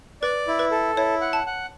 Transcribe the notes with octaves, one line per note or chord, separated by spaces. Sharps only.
B4 D5
E4
B4
A4
E4 C#5
F#5
A5
F#5